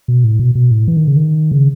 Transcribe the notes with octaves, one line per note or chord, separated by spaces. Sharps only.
B2
A2
B2
B2
A2
E3
D#3
C#3
D#3
C#3